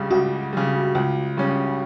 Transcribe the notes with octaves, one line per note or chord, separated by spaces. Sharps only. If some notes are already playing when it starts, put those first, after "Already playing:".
Already playing: C#2 C#3 G3
C#2 F#4
C#3 G3
C#2
C#3 G3 C#4